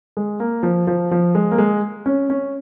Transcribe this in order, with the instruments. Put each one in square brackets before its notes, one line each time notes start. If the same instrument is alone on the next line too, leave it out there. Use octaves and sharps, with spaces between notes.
[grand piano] G#3
A#3
F3
F3
F3
G#3
A#3
G#3
C#4
C#4